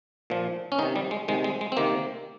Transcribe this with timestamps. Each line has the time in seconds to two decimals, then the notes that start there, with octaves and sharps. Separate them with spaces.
0.30 A#2 F3
0.72 C#4
0.79 D#3 D#4
0.82 C3
0.96 G3
1.11 G#3
1.28 C3 D#3 G#3
1.44 G#3
1.61 G#3
1.72 C4
1.77 C3 D#3 A#3